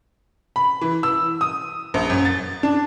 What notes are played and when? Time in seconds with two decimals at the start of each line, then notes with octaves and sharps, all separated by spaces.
0.56 B5
0.81 E3
1.03 E6
1.41 D#6
1.94 A#1
2.10 F#2
2.25 A6
2.63 D4